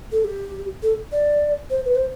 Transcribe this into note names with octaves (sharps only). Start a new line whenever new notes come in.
A4
G4
A4
D5
C5
B4
C5